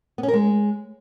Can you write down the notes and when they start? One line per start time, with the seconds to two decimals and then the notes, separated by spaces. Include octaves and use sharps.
0.18 B3
0.23 C#4
0.28 A#4
0.33 G#3